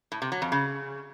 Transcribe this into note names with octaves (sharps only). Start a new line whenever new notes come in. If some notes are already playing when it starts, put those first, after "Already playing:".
A2
C3
F#3
F2
C#3